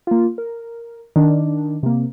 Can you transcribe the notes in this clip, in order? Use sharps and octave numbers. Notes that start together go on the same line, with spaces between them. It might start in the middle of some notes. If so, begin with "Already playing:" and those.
A#3 F4
A#4
D#3 D4
C3 A#3